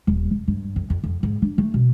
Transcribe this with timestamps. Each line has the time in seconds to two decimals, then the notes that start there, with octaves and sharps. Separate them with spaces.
0.07 D#1
0.31 C3
0.48 G2
0.76 F2
0.90 F2
1.04 F2
1.23 G#2
1.42 D4
1.58 A3
1.74 B2